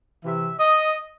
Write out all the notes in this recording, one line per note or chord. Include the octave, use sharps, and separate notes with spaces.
C3 E3 E5
D#5